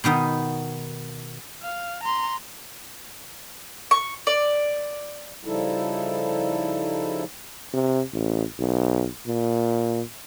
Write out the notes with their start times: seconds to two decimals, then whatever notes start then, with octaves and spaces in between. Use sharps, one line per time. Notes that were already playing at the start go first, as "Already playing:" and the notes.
0.04 B2 D#3 B3 D#4
1.63 F5
2.04 A#5 C6
3.91 C#6
4.27 D5
5.45 C#3 F3 G3 D#4 E4 A4
7.74 C3
8.13 A1
8.59 B1
9.27 A#2